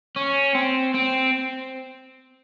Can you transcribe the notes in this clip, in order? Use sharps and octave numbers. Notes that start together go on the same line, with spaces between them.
C#4
C4
C4